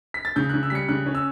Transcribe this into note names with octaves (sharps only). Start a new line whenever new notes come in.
B6
A6
C#3 G6
F#6
C#3
E6
G3 B6 C#7
C#3 F#6
C#4
E6